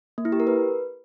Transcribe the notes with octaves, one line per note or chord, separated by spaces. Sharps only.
A#3
E4
G4
A#4
B4